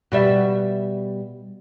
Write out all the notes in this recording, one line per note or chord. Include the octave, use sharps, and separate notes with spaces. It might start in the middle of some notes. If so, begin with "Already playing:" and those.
B2 G3 E5